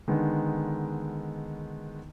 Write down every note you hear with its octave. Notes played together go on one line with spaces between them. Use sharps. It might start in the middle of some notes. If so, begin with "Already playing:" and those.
D3 D#3 G#3 B3 D#4